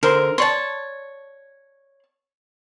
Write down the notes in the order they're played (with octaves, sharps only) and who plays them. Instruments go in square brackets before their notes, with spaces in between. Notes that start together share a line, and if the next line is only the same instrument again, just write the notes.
[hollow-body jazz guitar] D3 C5 C6 [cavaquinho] A#4
[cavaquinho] C#5 A5 [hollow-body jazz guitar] D5 C6